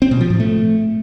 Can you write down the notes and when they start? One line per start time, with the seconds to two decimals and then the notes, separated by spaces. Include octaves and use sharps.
0.02 C4
0.11 B2
0.21 F3
0.30 A2
0.40 A3